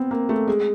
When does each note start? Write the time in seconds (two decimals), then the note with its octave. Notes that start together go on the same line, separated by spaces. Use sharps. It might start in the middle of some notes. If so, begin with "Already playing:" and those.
Already playing: B3 C4
0.11 A#3
0.29 A3
0.48 G#3